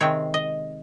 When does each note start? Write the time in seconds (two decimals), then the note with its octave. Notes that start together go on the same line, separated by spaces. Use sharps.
0.01 C3 D#3 G#3 C4 C#5
0.34 D#5